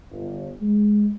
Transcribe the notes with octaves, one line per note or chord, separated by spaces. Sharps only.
G1
G#3